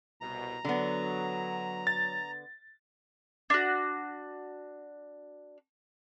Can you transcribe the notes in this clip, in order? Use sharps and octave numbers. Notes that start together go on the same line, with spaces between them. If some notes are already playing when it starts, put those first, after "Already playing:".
C2 B2 A#5
D3 F#3 B3
A6
D4 F#4